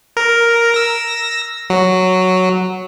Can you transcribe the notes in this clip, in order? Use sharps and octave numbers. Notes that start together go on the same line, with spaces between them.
A#4
E6 A#6
F#3